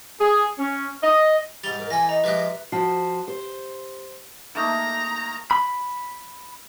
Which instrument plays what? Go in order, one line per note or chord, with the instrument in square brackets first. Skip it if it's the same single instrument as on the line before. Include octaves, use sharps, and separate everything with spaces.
[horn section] G#4
C#4
D#5
[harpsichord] G#2 G3 [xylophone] A6 F7 G7
[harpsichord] G#2 [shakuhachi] A#4
[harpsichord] E3 A4 [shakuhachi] G#5 [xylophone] A#6
[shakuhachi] D#5 [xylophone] A#5
[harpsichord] F3 G#3 G4 [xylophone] B4 E5 F#6
[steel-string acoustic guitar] F3 F#4 C5 [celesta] A5 C7
[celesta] G4 [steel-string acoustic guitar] C5
[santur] A3 A#3 D#4 [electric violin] A#5
[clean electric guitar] B5